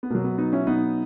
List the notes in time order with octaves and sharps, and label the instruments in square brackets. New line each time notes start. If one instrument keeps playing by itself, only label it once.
[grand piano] B3
B2 F#3 A#3
B3
B3 D#4
C#4 E4
B3 D#4